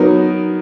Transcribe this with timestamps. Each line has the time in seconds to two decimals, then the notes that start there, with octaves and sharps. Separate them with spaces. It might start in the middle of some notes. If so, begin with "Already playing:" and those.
Already playing: F#3 B3 D#4 F#4 A#4